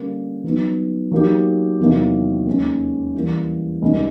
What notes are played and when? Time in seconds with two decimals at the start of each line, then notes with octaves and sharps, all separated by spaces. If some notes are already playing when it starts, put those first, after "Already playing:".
Already playing: D3 G3 A#3 C#4
0.44 F#3 B3 D#4
1.12 F#3 A#3 D#4 G4
1.79 E2 C3 D#3 F#3 A#3
2.46 D#2 D#3 G#3 C#4
3.14 E3 G3 A#3
3.82 C#2 C3 D#3 G3